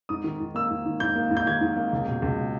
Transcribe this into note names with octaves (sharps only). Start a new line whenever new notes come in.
G#2 D#6
D#3
G#2
A#3 E6
G#2
D#3
G#2 G6
A#3
G#2
G6
D#3 G#6
G#2
A#3
C#2
B2
C#2
G#3